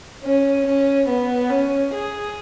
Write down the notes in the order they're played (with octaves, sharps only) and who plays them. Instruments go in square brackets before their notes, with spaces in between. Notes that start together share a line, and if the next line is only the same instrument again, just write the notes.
[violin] C#4
C#4
B3
C#4
G#4